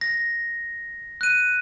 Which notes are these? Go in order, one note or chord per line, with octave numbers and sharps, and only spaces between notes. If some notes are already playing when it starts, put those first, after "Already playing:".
A#6
F#6 D#7